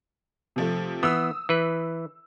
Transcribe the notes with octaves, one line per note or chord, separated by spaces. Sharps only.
C3 F3 A3
E3 B3 D#6 E6
E3 B4